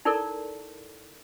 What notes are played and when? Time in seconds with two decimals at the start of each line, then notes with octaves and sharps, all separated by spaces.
0.05 D#4 E4 A4 A#4 D5